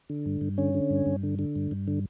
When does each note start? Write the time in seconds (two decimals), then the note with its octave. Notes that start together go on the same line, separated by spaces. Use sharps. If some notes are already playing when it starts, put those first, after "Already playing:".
0.10 D3
0.26 G2
0.41 G2
0.58 D3 C#4
0.74 D3
0.90 G2
1.06 G2
1.23 D3
1.39 D3
1.56 G2
1.71 G2
1.88 D3